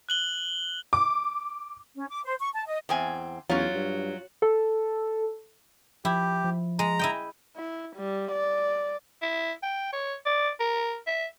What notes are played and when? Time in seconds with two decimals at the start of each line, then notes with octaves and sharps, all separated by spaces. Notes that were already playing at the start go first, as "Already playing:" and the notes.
0.09 F#6 F#7 G7
0.93 D6
1.96 C#4
2.09 D6
2.24 C5
2.40 C#6
2.54 A5
2.66 D#5
2.89 E2 C4 G#5
3.49 E2 F#3 C#4 F4
3.74 G2
4.42 A4
6.05 F3 E4 G4
6.45 F3
6.79 G#3 A#5
6.99 E4 D#5 G5
7.56 E4
7.96 G3
8.32 D5
9.22 E4
9.63 G5
9.92 C#5
10.26 D5
10.60 A#4
11.07 E5